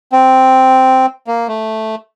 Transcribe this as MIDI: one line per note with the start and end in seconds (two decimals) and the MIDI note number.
0.12 1.06 60
1.27 1.47 58
1.48 1.95 57